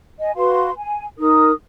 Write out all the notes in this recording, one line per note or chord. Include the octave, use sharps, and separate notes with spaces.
D#5 G#5
F#4 B4 F5 C6
G#5
D#4 A#4 D#6